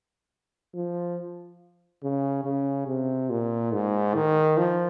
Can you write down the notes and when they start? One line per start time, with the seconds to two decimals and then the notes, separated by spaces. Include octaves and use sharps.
0.75 F3
2.03 C#3
2.44 C#3
2.87 C3
3.30 A#2
3.72 G#2
4.15 D#3
4.58 F3